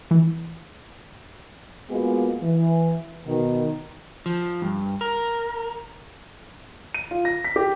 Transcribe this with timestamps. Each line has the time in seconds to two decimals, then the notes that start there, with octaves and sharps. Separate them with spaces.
0.11 E3
1.91 G#3 A#3 B3 F4 F#4 G#4
2.43 E3
3.27 B2 D#3
4.26 F3
4.62 G2
5.01 A#4
6.94 D#7
7.11 F4
7.25 A#6
7.45 B6
7.56 G4